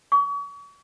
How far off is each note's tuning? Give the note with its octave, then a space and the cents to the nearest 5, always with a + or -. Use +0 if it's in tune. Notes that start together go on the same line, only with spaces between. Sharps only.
C#6 +40